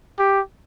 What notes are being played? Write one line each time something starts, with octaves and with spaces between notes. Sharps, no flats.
G4